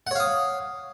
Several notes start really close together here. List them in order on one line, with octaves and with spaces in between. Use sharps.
F#5 C#5 F5 D#6